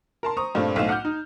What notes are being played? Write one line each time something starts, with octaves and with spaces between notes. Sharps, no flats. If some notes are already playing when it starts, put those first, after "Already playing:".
A#4 A5 C6
C5 A#5 C#6 D#6
G2 A#2 A3 A#3 C4
B1 A2 A3 C5 F5 E7
F#5 D6 F6 G6
D#4